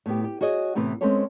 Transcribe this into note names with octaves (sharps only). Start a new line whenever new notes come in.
A2 B3 G4
G4
F#4 G#4 C#5 D#5
A2 C3 E3 B3 B4
G#3 C4 C#4 A4 B4 C#5